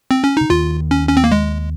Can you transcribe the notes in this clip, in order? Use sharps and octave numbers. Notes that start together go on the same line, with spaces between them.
C4
C#4
C#3 D#4
D#2 D#3 F4
C#4
C#4
C4
A#3
G#3